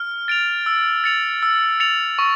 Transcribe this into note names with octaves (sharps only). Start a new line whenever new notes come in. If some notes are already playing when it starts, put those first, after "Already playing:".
Already playing: F6
A6 D7 F7
E6
A6 C#7 F7
E6
A6 C#7 F7
C#6